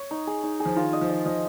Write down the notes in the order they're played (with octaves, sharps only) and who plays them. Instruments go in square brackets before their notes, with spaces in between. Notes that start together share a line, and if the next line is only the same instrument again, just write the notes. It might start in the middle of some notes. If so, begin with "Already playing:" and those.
Already playing: [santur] C#5
D#4
G#4
D#4
G#4
[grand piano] F3
[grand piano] D#3 [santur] F4
[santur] D#5
[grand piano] F3
[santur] D#5
[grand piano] F3 [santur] D#5